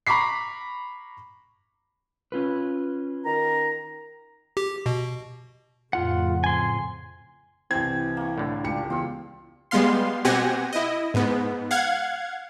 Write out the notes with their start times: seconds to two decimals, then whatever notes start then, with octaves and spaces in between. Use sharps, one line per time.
0.07 A#5 B5 C#6 D6 B6 C7
2.32 C#4 F4 B4
3.25 D#3 A#5
4.57 G4
4.86 B2
5.93 F2 A2 C#3 F4 F#5
6.44 G#5 C6
7.71 C2 E3 C4 G5 G#6
8.17 A#3 C#6
8.38 A2 D3
8.64 C#2 D4 G4 C#7
8.90 E2 F4 C6 E6
9.71 G3 G#3 B3 F5 C6
10.25 B2 C4 G4 F#5 G#5 A#6
10.73 E4 D#5
11.14 G#2 B3
11.71 F5 F#5 G#6